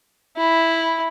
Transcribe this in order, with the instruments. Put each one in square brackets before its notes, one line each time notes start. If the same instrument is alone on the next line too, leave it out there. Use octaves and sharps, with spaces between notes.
[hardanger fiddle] E4